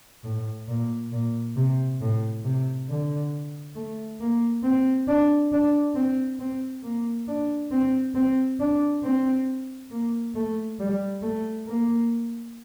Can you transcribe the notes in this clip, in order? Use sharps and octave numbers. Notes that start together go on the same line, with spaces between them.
A2
A#2
A#2
C3
A2
C3
D3
A3
A#3
C4
D4
D4
C4
C4
A#3
D4
C4
C4
D4
C4
A#3
A3
G3
A3
A#3